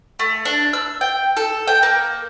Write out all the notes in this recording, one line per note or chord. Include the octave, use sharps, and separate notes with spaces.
A3
D4
E6
G5
A4
G5
A#3